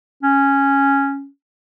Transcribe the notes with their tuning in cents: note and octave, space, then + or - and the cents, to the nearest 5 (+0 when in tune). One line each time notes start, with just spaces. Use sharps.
C#4 -5